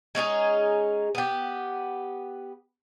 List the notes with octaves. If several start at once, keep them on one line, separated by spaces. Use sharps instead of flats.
G#3 C#4 D#4 G#4
B3 G4